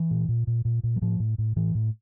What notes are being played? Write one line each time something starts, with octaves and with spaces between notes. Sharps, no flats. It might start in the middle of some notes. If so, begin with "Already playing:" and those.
Already playing: E3
A#2
A#2
A#2
A#2
A#2
F#3
A2 F3
A2
A2
A2 E3
A2